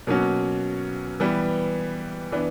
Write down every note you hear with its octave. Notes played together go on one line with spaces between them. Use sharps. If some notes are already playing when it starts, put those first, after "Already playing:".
B2 F#3 A#3 C#4 F#4
E3 G3 B3
E3 B3 D4